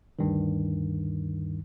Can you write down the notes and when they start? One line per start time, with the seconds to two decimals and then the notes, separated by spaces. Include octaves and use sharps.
0.19 D2 G2 D#3